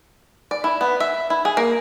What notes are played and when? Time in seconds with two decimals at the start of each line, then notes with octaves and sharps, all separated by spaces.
0.51 D5
0.64 E4
0.81 B3
1.00 E5
1.30 E4
1.45 G#4
1.57 A#3